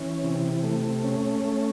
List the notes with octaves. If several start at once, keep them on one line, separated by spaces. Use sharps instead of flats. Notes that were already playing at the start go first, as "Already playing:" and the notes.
Already playing: E3 C#4
C3
A3
C#4
A3